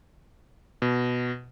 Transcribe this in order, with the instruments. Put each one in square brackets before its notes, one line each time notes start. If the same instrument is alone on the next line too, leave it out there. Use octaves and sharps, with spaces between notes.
[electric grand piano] B2